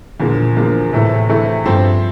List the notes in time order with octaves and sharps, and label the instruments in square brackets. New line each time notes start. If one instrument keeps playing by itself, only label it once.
[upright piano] E2 D3 F3 A#3 [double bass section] A#2
[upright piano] E2 D3 F3 A#3
[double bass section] A2 [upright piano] C3 E3 A3 E4 A4
[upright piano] C3 E3 A3 E4 A4
[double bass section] G2 [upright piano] F3 C4 E4 A4 C5